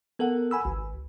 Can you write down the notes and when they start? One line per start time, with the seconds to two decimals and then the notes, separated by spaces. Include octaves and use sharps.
0.19 B3 A4 A#4 F#5
0.51 G#5 B5 E6
0.65 G#1 C#2